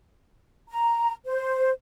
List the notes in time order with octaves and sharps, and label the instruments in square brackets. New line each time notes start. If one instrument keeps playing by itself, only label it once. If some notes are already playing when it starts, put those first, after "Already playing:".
[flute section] A#5
C5